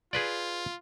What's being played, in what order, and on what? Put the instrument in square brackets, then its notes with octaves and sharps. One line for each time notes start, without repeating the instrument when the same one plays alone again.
[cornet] F4 [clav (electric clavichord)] G#4 B4 D5